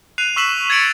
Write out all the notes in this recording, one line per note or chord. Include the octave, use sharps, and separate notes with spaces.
F#6 C7 D#7 F7
C#6 E6 B6 E7 F#7
G#6 A6 B6 C#7 D7 F#7